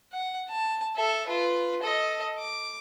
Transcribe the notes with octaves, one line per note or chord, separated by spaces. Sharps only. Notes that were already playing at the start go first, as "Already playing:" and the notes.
F#5
A5
A4 E5
F4 B4
A4 D#5
D6